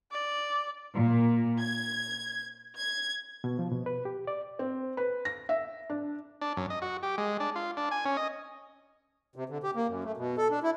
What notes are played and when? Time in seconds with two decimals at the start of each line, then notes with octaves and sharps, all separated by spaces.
0.12 D5
0.96 A#2
1.60 G#6
2.76 G#6
3.44 B2
3.59 F3
3.72 B2
3.86 B4
4.05 G4
4.27 D5
4.59 C4
4.97 B4
5.25 A#6
5.49 E5
5.90 D4
6.41 D4
6.57 F#2
6.70 D#5
6.82 F#4
7.03 G4
7.18 G#3
7.40 D4
7.56 F4
7.77 D4
7.91 G#5
8.05 C#4
8.17 D#5
9.36 C3
9.49 D3
9.63 G4
9.75 A#3
9.87 F#2
10.04 A3
10.17 B2
10.38 A4
10.51 D4
10.63 E4